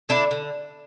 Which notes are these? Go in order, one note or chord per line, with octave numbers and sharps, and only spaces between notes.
D3 D4 E4
D3